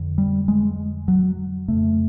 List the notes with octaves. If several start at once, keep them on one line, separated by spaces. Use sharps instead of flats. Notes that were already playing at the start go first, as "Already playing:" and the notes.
Already playing: F2 D3
G3
G#3
F#3
F2 C#3 A3